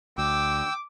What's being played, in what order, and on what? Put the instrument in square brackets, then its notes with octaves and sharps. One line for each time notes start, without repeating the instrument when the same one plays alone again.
[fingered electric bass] D2 [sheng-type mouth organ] G5 E6 [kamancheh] D6